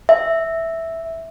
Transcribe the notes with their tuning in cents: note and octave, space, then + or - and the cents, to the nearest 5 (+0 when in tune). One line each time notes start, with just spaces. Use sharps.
E5 -5